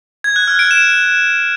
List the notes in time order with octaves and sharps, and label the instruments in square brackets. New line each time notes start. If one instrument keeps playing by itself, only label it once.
[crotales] G#6
F#6
F6
D7
E7